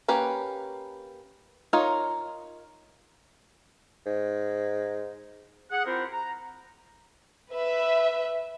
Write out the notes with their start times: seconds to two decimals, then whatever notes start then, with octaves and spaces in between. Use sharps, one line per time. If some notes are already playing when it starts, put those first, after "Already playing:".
0.08 A#3 C#4 G4 B4
1.73 D#4 F4 A#4 C#5
4.06 G#2
5.71 G#4 F#5
5.86 C4 E4 F4 G4 A#4 C5
6.12 A#5
7.51 B4 E5